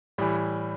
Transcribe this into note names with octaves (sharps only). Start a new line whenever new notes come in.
A2 E3 G3